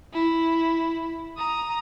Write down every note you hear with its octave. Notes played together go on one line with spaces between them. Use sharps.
E4
A#5 D#6